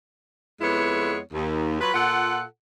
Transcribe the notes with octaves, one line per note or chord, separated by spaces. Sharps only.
F2 G#3 B3 E4 C#5
D#2
F#3 F4 B4
A#2 F4 A4 F#5